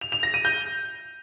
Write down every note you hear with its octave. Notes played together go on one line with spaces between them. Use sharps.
F7
F7
A#6
D#7
G6